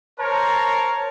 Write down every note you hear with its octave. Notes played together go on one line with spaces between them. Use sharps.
A#4 C5 C#5 A5 A#5